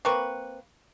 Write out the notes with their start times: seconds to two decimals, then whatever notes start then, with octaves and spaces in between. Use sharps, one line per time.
0.05 A#3 C4 B4 C#6